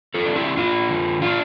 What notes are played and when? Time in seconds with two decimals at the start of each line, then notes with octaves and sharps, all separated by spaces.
0.14 F4 A4
0.25 D4
0.36 E4 G4
0.57 D4 F4
0.89 D3
1.22 D4 F4